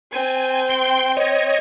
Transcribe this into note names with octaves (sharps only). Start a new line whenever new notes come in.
C4 G#5
G5 C6
C#5 D#5